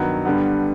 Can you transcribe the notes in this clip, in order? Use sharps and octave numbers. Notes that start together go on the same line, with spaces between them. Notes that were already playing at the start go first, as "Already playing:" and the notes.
Already playing: G2 D#3 F#3 B3
G2 D3 G3 B3